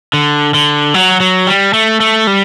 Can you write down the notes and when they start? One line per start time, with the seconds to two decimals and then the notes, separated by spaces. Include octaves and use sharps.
0.13 D3
0.54 D3
0.94 F#3
1.20 F#3
1.47 G3
1.73 A3
2.00 A3
2.27 G3